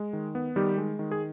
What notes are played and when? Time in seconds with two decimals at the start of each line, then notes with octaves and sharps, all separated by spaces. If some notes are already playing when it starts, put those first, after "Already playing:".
Already playing: G#3
0.13 D#3
0.35 B3
0.56 D#3 G3 G4
0.78 G#3
0.99 D#3
1.12 G#4